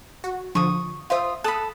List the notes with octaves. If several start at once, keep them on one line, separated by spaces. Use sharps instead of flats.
F#4
D3 F3 C#6 D#6
F4 C5 E5 F5 D#6
A4 B5 D#6 F#6